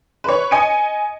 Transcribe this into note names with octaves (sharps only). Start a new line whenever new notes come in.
B4 C#5
D#5 G#5 C#7 D#7